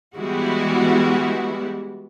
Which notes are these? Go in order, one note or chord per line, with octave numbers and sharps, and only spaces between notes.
E3 G3 G#3 B3 E4 F#4